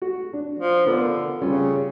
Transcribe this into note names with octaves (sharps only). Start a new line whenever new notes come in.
F#4
D4
F3
D3 B3 F4 A#4
C#3 G3 C#4 F4